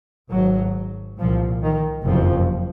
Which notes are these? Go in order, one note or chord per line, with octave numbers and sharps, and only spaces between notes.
G#1 G#2 F#3
C2 A#2 F3
D#3
F#1 F2 C3 F3